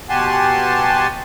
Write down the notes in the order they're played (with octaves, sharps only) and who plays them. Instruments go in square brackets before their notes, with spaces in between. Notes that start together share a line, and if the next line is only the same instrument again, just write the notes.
[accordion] B2 G4 F#5 G#5 A5 C6